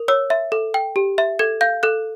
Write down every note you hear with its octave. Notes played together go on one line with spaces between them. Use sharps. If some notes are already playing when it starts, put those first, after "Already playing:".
Already playing: A#4
C#5 E6
E5
A4
G5
G4
E5
A4 G#6
F5 G6
A4 F#6